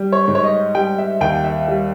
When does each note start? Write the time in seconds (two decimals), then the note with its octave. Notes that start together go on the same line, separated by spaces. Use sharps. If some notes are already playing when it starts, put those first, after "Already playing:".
Already playing: G3
0.12 C#5
0.28 G#2
0.35 C#5
0.44 D#5
0.75 G3 G5
0.98 E5
1.20 D#2 G5
1.44 E5
1.68 G3